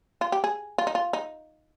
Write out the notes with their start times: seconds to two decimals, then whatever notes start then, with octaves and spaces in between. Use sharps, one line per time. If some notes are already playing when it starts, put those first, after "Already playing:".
0.21 F4
0.32 G4
0.44 G#4
0.78 F4
0.87 D#4
0.95 F4
1.13 D#4